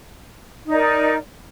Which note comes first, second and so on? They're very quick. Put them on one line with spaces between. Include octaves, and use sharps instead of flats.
D#4 D5 A#4